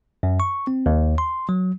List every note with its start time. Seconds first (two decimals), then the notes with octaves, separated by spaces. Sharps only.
0.23 F#2
0.40 C#6
0.67 C4
0.86 D#2
1.18 C6
1.49 F#3